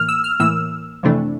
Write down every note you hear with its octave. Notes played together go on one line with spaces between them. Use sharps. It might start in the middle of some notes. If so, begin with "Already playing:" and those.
Already playing: A2 E3 A#3 F6
E6
F6
A2 E3 A#3 E6
F2 C3 E3 A3 D4